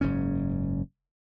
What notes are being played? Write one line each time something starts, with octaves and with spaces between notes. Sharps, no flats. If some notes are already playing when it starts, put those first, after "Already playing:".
F#1 G#2 C#4